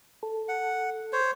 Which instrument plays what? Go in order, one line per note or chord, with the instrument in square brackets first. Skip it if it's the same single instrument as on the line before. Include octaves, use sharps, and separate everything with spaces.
[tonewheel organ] A4
[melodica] F#5
C5 C#5